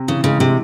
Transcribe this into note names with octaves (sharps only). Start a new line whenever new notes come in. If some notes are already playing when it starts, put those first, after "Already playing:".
Already playing: C3
C#3 E3
C#3 G#3
C3